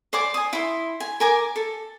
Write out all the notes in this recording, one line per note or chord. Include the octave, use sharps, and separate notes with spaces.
C5 D5 G#5 D6
G#5 D#6
E4 C6
G#5
A#4 G#5 D6
A4